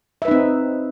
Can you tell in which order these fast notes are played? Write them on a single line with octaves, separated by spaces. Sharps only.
E5 B4 D#4 C4